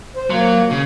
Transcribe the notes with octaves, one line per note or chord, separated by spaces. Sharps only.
C5
F#3 A#3
C#3